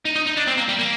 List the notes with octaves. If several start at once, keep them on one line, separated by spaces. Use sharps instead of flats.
D#4
D#4
D#4
D4
C4
A#3
G3
A#3